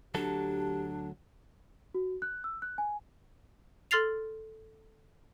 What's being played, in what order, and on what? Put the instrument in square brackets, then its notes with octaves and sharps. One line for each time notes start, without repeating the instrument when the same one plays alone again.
[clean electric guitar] D2 F#3 A4 [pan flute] D4 [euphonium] G4
[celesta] F#4
F#6
E6
F#6
G#5
[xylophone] A4 C6 F6 A6 C7 F7